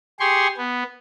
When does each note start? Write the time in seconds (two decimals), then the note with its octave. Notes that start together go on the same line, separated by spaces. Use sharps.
0.20 G4 G#4 C6 C#6
0.58 B3